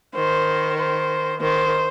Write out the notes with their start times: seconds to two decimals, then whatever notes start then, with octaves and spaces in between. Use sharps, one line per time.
0.15 D#3 C5
0.78 C5
1.40 D#3 C5